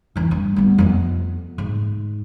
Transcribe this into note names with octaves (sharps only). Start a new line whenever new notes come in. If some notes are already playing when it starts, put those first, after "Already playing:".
F2 E3
G2
G3 B3
F2 B3
G#2